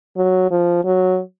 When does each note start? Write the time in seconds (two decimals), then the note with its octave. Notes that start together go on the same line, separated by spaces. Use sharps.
0.17 F#3
0.50 F3
0.85 F#3